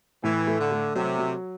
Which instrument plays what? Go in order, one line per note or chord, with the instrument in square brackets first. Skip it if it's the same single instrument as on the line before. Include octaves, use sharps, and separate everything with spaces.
[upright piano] A2 [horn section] E3
[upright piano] A3
[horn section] D3
[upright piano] A3
[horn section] C3 [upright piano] F#3
[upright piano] F#3